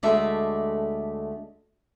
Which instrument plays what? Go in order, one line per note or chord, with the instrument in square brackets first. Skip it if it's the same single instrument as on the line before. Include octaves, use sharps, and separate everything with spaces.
[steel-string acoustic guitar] D2 G#3 A3 D5 E5